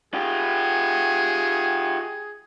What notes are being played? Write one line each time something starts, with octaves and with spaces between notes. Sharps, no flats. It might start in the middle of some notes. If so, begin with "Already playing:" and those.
F4 G4 G#4